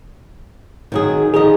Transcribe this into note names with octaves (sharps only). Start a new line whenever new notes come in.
D#3 F#3 G#4
D#3 F3 G#4 D#5